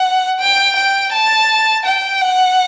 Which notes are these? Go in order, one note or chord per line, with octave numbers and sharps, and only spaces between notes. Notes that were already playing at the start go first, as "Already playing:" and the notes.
Already playing: F#5
G5
G5
A5
G5
F#5